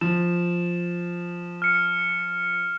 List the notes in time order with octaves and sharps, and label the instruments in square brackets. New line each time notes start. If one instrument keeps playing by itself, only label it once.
[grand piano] F3 [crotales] E7
[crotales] F6 C#7